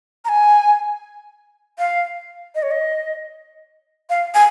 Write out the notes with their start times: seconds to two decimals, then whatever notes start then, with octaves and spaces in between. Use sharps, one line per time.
0.25 A#5
0.29 G#5
1.79 F5
2.55 D#5
2.63 C#5
2.71 D#5
4.10 F5
4.35 G#5